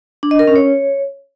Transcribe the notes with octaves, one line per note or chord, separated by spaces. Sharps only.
D4
D#5
A#4
C#4
C#5